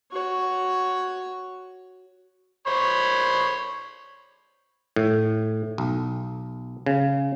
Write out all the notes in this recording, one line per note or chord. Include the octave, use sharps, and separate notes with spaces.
F#4 C#5
C5 C#5 B5
A2
B1
C#3